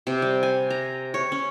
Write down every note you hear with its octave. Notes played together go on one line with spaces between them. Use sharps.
C3
G3
G#5
A#5
C#5
C#4